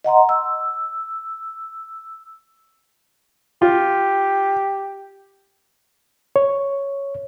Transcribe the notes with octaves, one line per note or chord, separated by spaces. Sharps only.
D#5 F#5 A#5 C6
E6
F4 G4
C#5